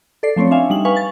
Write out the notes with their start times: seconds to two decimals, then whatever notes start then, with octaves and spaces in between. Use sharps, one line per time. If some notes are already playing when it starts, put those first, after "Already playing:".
0.23 A4 D5 C7
0.36 F3 A3 C4 C#4 C#5
0.51 D4 E5 F5 G#5
0.70 G3 D#4 F#7
0.85 B4 F5 G#5 C#6
0.96 A6